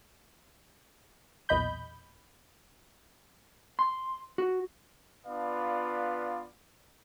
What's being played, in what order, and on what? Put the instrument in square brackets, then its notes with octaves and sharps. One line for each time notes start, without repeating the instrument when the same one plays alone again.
[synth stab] B1 E2 A#2 D#5 B5 G6
[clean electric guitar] C6
F#4
[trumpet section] B3 D4 F4 B4 D5 F5